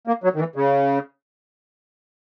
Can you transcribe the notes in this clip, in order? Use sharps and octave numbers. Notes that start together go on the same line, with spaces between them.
A#3
F#3
D#3
E3
C#3